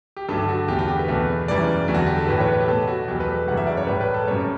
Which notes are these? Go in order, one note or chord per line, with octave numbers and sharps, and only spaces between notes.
G4
G2 D3 F#3 A3 A4
F#4
E2 D3 A3 G4
F#4
G4
B4
E2 B2 A3
F#2 C#3 E3 G3 D5
E2 D3 F#3 A3
F#4
G4
A4
A2 E3 A3 B4
C#5
B4
G4
B2 A3 A4
F#4
E2 B2 F#3 G4
B4
A4
F#2 C#3 E3 G3 F#5
E5
D5
C#5
A2 G3 B4
B4
A4
F#2 C#3 G3 C#5